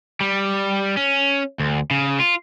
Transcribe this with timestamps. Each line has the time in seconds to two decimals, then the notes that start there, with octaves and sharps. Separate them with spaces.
0.21 G3
0.97 C#4
1.59 D2
1.91 C#3
2.20 F4